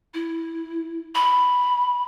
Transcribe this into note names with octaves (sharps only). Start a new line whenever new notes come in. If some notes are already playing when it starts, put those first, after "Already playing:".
E4
B5